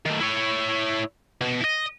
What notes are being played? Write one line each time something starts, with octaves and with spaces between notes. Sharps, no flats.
D#3 A3
E4 C#5
B2
E4 D#5